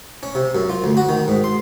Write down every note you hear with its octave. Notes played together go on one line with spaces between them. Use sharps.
C#4
C3
F#2
F4
D2
F#4
D#3
G#2
C6